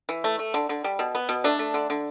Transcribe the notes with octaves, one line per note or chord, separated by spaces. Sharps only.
E3
A3
A3
D3
D3
G3
B2
B3
B2
A3 D4
A3
D3
D3